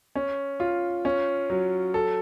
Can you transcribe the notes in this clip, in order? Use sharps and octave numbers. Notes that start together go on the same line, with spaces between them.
C#4
F4
C#4
F#3
A4